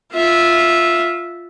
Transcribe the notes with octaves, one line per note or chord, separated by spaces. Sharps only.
F4 E5